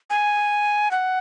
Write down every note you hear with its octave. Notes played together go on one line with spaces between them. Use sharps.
G#5
F#5